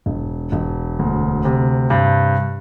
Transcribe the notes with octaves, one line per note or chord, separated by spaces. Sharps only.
E1
E1
D2
C3
G2